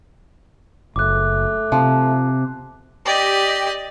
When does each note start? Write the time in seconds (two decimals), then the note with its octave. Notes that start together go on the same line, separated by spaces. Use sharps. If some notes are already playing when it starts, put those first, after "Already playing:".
0.96 F#1 A3 D6 F#6
1.72 C3 F3
3.05 G4 D5 D#5